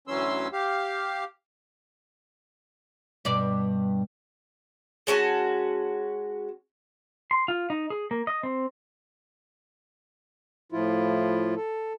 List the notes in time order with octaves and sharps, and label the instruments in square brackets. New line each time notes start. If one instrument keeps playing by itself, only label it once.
[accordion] D2 E3 F#3 C#4 C6 E6
G4 F5
[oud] G2 B2 D5
[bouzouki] G#3 C#4 F#4 A5
[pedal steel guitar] C6
F4
D#4
G#4
A#3
D#5
C4
[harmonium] A2 F3 E4 F4
A4